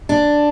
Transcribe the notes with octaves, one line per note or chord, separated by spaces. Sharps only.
D4